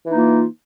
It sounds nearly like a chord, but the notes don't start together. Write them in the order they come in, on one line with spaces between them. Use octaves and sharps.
E3 D#4 A#3 F4